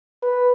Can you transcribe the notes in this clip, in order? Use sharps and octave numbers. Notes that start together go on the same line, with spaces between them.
B4